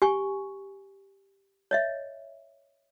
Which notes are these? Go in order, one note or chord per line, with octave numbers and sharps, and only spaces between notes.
G4 G#5 C#6
C#5 D#5 E5